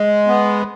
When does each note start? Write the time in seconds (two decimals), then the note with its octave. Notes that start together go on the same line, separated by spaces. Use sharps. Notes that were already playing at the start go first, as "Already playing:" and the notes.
Already playing: G#3
0.27 B3